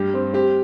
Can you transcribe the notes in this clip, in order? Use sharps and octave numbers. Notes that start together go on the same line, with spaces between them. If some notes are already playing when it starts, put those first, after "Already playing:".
Already playing: G2 G3 G4
C4
C4 G4